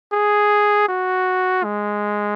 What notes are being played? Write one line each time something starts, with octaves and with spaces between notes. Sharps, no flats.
G#4
F#4
G#3